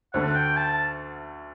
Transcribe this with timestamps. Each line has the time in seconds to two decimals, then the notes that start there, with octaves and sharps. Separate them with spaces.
0.14 D2 D3 A3 F#5
0.35 G5
0.57 A5